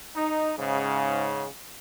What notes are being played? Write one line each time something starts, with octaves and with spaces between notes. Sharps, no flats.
D#4
G#2 C#3